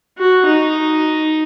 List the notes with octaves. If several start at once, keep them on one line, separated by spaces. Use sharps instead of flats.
F#4
D#4